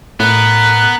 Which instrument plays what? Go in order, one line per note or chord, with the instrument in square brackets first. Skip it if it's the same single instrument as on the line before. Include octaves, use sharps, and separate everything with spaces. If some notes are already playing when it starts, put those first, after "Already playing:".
[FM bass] A2 [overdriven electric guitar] B3 [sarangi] A#4 [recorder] F#6